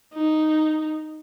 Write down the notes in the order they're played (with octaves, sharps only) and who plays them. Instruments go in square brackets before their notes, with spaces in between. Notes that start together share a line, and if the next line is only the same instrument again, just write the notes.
[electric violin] D#4